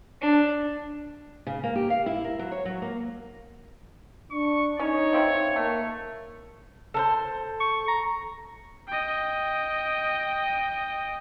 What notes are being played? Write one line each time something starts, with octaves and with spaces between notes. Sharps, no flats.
D4
C#3
A#3
G4
F5
E4
A#4
F#3
C#5
F#3
A#3
D4 C#6
C#4 D#4 C#5
F3 C4 E4
A3 A#3
A4 A#4 C5
C#6
A#5
D#5 G5